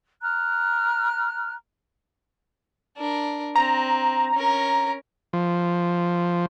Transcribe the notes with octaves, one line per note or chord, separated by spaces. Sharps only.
A#5 F6 F#6
D4 A#4
C4 A#5
C#4 A#4
F3